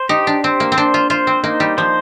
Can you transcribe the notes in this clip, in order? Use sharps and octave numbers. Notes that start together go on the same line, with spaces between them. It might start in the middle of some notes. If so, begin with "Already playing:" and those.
Already playing: C5
D#4 G4
D4
C4 C5
A#3
C4
D4 C5
F4
F4 C5
C4
A#3 D#4
G3
F3 C5